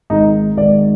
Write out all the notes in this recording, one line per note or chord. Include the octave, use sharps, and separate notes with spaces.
G#1 G#2 D#3 D#4
G#1 G#2 D#3 D5